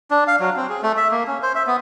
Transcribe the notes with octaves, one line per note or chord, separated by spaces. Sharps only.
D4
F5
F#3
C4
G#4
A3
E5
A#3
C#4
C5
E5
B3